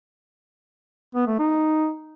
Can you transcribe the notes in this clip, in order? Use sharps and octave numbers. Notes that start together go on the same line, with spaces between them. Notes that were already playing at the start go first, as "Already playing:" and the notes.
B3
A3
D#4